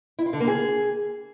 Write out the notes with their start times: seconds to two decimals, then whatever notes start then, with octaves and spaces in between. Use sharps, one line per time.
0.19 E4
0.26 F4
0.33 D3
0.40 A#3
0.48 G#4